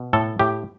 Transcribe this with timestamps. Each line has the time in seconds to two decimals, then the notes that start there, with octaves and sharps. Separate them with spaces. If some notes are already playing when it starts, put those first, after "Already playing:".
Already playing: B2
0.13 A2 A4
0.39 A2 G4